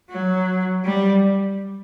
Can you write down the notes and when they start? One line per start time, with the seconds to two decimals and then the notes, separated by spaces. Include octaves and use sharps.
0.10 F#3
0.85 G3